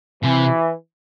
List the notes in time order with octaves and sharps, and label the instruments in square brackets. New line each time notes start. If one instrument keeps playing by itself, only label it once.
[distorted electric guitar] C3 [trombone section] E3